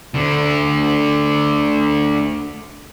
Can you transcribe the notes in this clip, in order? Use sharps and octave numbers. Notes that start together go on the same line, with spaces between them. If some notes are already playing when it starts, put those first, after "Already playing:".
D2 D3